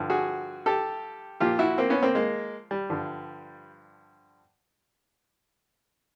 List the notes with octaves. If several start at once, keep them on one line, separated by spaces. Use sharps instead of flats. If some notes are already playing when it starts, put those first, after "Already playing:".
Already playing: G2 D3 F3
F#4 G#4
G4 A4
A#2 F3 F4 G4
E4 F#4
A#3 C4
B3 C#4
A#3 C4
G#3 A#3
G3
G2 D3 F3